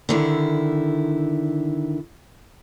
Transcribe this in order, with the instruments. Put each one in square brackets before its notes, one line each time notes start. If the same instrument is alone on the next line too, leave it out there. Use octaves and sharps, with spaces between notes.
[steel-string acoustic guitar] D3 D#3 E4